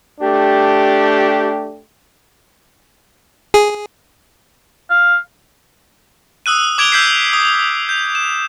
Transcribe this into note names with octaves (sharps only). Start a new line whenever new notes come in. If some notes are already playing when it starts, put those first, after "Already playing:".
A3 D4 G4
G#4
F5
D#6 E6 F#6 D#7
D6 G#6 D7 F7 G7
E6 G6 G#6 B6 C7
D#6
G6
E7